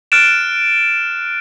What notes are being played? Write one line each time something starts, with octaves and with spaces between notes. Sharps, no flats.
F6 F#6 A6 D7 E7